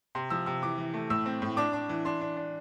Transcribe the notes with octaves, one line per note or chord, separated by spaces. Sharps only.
C3 C6
F3 E6
C3 E6
E3 D6
E3
A3
A2 E6
C4
A2
D4 D6
D4
E3
D4 C6
D4
D4